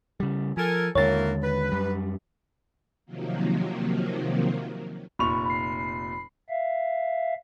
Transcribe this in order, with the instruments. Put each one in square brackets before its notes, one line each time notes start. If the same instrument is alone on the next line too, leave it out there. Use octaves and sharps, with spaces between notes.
[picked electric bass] C#3 G3
[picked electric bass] F3 [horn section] A4 A#4 G#5
[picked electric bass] D#2 D3 G#3 [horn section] A#3 E4 F#4 [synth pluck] C#5 A6
[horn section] B4
[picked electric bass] F#2 G3
[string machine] C3 D#3 F3 F#3 A#3
[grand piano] F1 A#2 F7 [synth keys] B5 C#6
[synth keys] B5 C7
[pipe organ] E5 F5